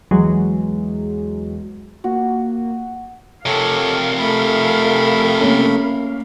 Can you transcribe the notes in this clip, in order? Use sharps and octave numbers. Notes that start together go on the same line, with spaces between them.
E2 F#3 G#3
A#3 F#4
F2 C3 A4 A#4 C#5 F5
A3 B5
A#3 C#4